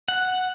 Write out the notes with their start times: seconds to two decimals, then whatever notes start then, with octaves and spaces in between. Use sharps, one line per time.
0.08 F#5